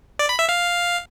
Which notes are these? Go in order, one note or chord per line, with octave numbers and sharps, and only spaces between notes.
D5
B5
E5
F5